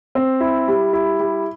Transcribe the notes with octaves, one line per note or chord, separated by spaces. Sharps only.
C4
E4
G3
E4
G3